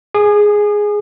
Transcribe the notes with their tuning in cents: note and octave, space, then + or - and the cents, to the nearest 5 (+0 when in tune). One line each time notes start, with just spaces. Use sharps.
G#4 +0 D#6 -35